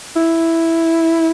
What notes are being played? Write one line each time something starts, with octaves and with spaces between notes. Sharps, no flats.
E4